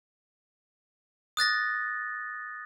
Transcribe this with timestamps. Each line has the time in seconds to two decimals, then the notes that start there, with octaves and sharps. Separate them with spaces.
1.37 D#6 F#6 A6 A#6